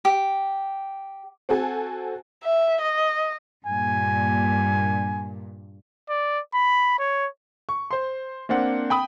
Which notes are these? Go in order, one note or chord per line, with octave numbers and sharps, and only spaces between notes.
G4
C4 F#4 A4 G#5
E5
D#5
G2 A#2 G#5
D5
B5
C#5
C#6
C5 C6
A#3 C4 D4 F#5
G5 B5 D#6